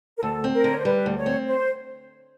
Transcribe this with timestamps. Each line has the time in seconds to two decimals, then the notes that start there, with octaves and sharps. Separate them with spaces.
0.19 A#4
0.23 D2 A4
0.44 C4
0.54 A#4
0.64 D3
0.69 C#5
0.77 C5
0.85 G3 B4
1.06 D2
1.16 C#5
1.26 C4
1.47 C5